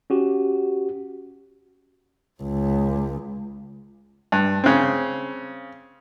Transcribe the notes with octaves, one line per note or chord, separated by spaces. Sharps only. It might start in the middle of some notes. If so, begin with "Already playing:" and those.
C#4 F#4 G4
C#2
G2
C#3 C4